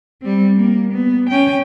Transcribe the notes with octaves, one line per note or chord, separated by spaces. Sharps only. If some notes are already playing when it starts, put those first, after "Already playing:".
G3 C4
A#3
B3
C#4 G5